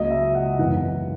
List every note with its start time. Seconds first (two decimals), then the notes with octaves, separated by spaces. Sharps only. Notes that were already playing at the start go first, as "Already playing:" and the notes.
Already playing: C#2 C#3 F#3 A#3 D#5
0.11 E5
0.35 F#5
0.59 G#1 F#2 E3 B3 F#5